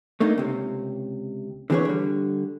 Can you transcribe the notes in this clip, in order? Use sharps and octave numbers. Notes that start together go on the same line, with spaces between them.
A3 A#3 D4 D#4
C#2 C3
D3 E3 C4 G#4 B4 C#5
D3 G3